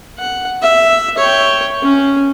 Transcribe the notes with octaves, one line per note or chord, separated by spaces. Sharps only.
F#5
E5
C#5 G5
C#4